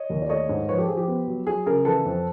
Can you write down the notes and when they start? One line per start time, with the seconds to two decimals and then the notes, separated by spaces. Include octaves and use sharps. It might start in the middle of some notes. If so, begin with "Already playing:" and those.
Already playing: C#5 D#5
0.10 D#2
0.22 D5
0.29 A3 C#5 D#5
0.49 G#2
0.69 F3 B4 C#5
0.78 G4 A4
0.88 F3 G#4
0.97 G4
1.08 B3
1.27 F#3
1.47 F#3 G#4
1.66 C#3 G#4 A#4
1.85 E3 A4 B4
2.05 F2